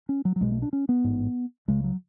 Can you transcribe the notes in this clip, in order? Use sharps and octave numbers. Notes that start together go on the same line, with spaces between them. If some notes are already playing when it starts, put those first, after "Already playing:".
C#4
F#3
F#3
B1 B2 G#3
A3
D4
C#4
B3
A1 G#2
C#2 C#3 G#3
F#3